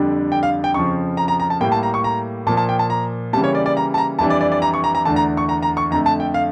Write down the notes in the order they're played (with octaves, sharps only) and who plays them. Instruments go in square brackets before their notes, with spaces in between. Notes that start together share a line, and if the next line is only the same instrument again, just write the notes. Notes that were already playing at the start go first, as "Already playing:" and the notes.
Already playing: [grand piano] F2 D3 G3 D4
G5
F5
G5
F2 C#3 F3 C#6
A#5
A#5
A#5
A5
A2 G3 A#3 E4 G5
A5
A#5
C#6
A#5
A#2 F3 A#3 A5
A5
G5
A5
A#5
C#3 E3 G3 A#3 A5
C#5
D5
D5
A#5
A5
A#5
F2 E3 G3 D4 A5
D5
D5
D5
A#5
C#6
A#5
A#5
E2 D3 A3 D4 A5
A#5
C#6
A#5
A#5
C#6
F2 D3 A3 A#5
A5
G5
F5